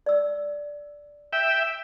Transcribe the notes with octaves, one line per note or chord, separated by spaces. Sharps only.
D5 E6
E5 G5